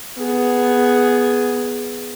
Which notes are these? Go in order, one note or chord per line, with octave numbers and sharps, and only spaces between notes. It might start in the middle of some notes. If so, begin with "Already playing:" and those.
B3 G#4